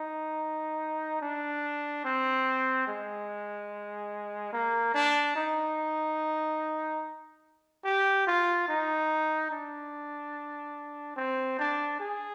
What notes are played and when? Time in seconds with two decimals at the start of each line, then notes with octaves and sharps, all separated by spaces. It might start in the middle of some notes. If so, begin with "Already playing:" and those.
Already playing: D#4
1.21 D4
2.05 C4
2.88 G#3
4.53 A#3
4.94 D4
5.36 D#4
7.84 G4
8.27 F4
8.68 D#4
9.51 D4
11.16 C4
11.59 D4
12.00 G#4